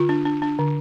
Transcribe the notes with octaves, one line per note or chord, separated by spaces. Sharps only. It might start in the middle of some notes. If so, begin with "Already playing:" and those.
Already playing: D3 F4
D4
D4
D4
D3